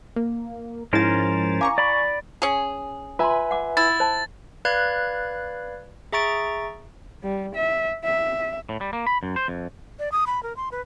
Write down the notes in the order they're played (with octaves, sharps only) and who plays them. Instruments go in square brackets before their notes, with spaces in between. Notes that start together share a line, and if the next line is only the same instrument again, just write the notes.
[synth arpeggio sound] A#3
[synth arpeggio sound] G#2 F3 A6 [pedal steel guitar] C#4 A#4 C5 [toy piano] E4
[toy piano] F5 D6 [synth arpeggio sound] G#5 A#5 C#6
[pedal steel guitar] D5 B5
[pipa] C#4 G#4
[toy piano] F4 C6 [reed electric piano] B4 E5 G#5
[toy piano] F#5 D6
[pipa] E4 [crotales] A6
[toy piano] C5 A5
[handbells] B4 D5 F5 B5 F#6 G#6
G#4 E5 A#5 C#6 A6 D7
[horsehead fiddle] G3
E5
E5
[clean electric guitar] A2
G3
A#3
B5
F#2
C5
F2
[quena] D5
D#6
B5
A#4
C6
B4